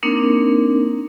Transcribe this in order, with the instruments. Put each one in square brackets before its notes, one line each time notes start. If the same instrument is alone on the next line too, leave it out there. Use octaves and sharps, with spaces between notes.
[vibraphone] A#3 C4 D4 D#4 A#4